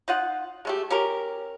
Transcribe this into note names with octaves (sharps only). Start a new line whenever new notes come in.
D#4 F4 F#5
G#3 A3 G4
C#4 G4 A#4